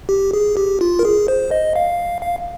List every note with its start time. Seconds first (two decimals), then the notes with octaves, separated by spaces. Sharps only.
0.09 G4
0.33 G#4
0.57 G4
0.81 F4
0.99 A#4
1.05 G#4
1.28 C5
1.51 D#5
1.76 F5
2.23 F5